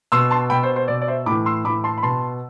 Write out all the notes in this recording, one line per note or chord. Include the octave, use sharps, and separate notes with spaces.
B2 C6 E6
A5 C6
B2 G5 B5
C5
C5
B2 D5
D5
C5 E5
A2 B5 D6
E3
C6 E6
A2 E3 B5 D6
A5 C6
B5
B2 A5 C6